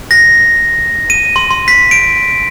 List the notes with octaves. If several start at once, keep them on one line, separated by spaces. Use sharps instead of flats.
A#6
D#7
C6
C6
B6
D7